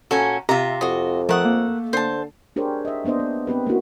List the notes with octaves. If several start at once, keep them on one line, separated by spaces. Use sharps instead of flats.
A#2 C#4 F#4 A4 G#5
C3 F4 G4 E5 A#5
F2 F#4 D#5
F3 A3 A#4 F#5 D#6
A#3
D3 C5 A5
D4 G4 G#4 A#4 C5 C#5
D#5 E5
A#3 B3 D4 C5 D#5
B3
B3 C4 G4 B4
A#3 B3 C#4 D4 E4 F#4